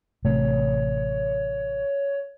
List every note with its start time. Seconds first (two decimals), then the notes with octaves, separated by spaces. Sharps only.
0.25 A1 C3 A3 C#5